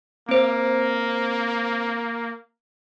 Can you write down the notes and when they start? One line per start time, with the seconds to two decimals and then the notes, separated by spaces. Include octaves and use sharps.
0.29 A#3 C4 C5